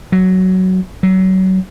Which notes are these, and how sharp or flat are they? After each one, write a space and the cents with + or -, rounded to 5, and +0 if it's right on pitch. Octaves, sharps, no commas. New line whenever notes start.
F#3 +10
F#3 +25